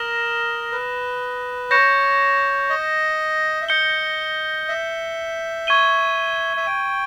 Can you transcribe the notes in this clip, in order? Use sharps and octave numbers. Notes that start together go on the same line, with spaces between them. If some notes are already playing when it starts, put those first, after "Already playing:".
Already playing: A#4 D#6 A#6 E7 G7
B4
C#5 G6 A#6 C#7 E7
D#5
E5
D#5 G6 C#7 G7
E5
C#6 G#6 D#7 G7
E5
G5